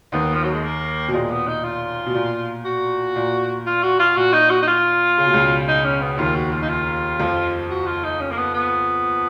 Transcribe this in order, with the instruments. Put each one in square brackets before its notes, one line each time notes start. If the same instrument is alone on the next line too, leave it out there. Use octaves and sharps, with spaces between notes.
[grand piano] D#2 D#3 [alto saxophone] B3
[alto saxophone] F3
F#3
G#3
A#3
[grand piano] B2
[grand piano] A#2 [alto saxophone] G#3
[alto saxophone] B3
D#4
F4
[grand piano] B2
A#2
[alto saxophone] F#4
[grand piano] A#2
[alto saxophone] F4
F#4
F4
[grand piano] A#2 [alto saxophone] F#4
[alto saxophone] D#4
F#4
D#4
F4
[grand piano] C#3
B2
C#2 C#3
[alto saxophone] D#4
C#4
B3
[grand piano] D#2 D#3 [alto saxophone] F4
[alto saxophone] F#4
F4
D#4
F4
[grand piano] F2 F3
[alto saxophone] F#4
F4
D#4
C#4
A#3
B3
B3